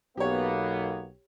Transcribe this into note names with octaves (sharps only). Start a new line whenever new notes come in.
B1 A#3 B3 G4 C#5